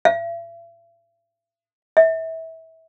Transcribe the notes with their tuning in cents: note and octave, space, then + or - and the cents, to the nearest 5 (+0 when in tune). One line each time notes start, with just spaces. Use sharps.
E5 +45
E5 -25